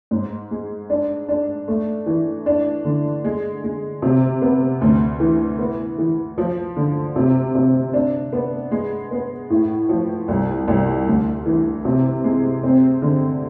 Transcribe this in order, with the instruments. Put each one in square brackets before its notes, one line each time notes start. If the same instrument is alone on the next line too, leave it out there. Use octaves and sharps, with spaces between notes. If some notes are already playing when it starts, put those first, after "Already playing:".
[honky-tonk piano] G#2
G#3
D4
D4
A3
E3
D4
D3
G#3
G#3
C3
B3
D2
E3
B3
E3
F3
D3
C3
C3
D4
B3
G#3
B3
A2
F3
C2
C2
D2
E3
C3
G#3
C4
D3